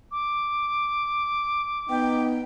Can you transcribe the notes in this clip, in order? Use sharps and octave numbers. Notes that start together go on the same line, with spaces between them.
D6
B3 D#4 G5